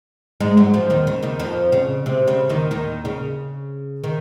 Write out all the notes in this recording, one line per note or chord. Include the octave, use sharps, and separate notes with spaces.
G#2 G#3
F#2 F#3
F2 F3
D#2 D#3
C#3
D#2 D#3
F2 F3
C#3
C3
C#3
D#2 D#3
D#2 D#3
C#3
D#3